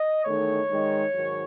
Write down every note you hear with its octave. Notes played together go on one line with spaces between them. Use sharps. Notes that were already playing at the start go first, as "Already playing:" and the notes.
Already playing: D#5
E2 D#3 A3 D#4 C#5
D#3 G#3 D#4
G#2 D#3 F#3